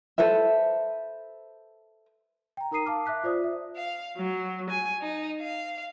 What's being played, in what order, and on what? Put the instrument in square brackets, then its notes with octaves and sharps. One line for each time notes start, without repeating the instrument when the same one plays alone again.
[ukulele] A4 B4 C5 E5
[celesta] G5 A#5
D#4 A#4 A#5 D#6 C7 D#7
F5 A5 D6 F6
E5 D6 F#6 B6
F4 C5 D5 D#6
E5
[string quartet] F5
F#3
G#5
D#4
F5